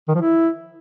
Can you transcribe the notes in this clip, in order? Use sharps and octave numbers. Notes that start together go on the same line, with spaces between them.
D#3
F3
E4